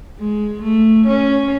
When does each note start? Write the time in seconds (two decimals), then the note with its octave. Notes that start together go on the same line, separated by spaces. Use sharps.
0.19 G#3
0.63 A3
1.07 C#4